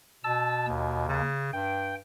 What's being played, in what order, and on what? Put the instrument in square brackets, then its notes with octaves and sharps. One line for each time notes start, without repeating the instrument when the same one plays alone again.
[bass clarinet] B2 [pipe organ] A5 E6
[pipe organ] D#2
[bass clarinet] C#3
[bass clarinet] G2 [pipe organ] G5